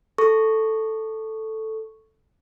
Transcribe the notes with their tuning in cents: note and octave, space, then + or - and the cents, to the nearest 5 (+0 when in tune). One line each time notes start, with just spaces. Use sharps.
A4 +0 C#6 +0